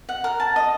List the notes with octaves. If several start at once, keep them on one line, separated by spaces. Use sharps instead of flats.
F#5
A#4
A5
D#5